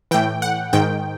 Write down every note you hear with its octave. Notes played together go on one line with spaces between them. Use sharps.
A2 E3 G5
F#5
G#2 D#3 G5